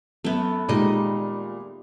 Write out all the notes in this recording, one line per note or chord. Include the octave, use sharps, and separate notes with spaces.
F#2 A3 B3
A#2 D#3 G3 G#3 D#4 D#5